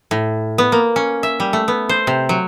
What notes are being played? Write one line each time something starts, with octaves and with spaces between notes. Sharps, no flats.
A2
B3
A#3
C#4
E5
G3
A3
B3
C5
C3
F#3